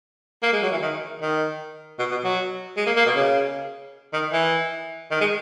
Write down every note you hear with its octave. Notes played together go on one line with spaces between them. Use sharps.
A#3
G#3
F#3
E3
D#3
D#3
B2
B2
F#3
G#3
A#3
A#3
B2
C#3
D#3
E3
D#3
G#3